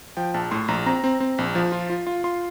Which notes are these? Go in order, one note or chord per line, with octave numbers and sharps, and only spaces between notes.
F3 G5
A#1 A5
A2 C6
A#1 A#5
C4 A#5
C4
C4
A#1
F3
F4
F4
F4
F4 C6